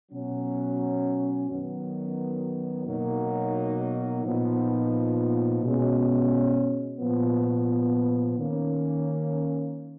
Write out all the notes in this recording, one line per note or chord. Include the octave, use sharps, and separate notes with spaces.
B2 F#3 C#4
F#2 D#3 F#3 B3
B2 F#3 A#3 D#4
A#2 F3 B3 D#4
B2 G#3 C#4
A#2 F3 B3
D#3 A#3 C#4